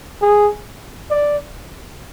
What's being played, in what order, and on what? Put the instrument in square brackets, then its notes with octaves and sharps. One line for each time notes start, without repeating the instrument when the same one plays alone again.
[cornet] G#4
D5